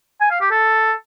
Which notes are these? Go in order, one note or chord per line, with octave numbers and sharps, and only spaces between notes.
G#5
F5
G4
A4